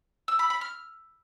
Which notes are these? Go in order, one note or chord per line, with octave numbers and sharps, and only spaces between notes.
E6
B5
B5
F6